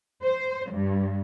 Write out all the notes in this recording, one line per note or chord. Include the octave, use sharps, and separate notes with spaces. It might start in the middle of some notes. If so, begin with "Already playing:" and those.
C5
G2